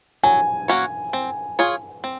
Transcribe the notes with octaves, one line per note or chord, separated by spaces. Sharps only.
F#3 G#5
A#3 C#4 F#4 C#5
C4
F4 G#4 C#5
C4